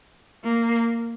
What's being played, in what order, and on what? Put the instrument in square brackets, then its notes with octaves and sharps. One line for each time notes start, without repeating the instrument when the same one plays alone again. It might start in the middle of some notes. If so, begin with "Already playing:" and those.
[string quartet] A#3